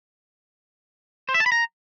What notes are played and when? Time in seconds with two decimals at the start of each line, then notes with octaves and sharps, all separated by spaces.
1.29 C5
1.34 E5
1.40 A5
1.46 B5
1.52 A#5